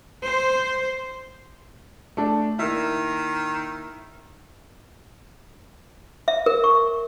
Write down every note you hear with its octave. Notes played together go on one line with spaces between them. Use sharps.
C5
A3 D4
D#3 A#3 E4
E5
A#4
C#6